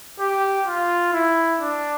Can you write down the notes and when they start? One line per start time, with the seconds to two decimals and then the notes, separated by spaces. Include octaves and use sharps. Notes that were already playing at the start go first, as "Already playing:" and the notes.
0.20 G4
0.67 F4
1.13 E4
1.60 D4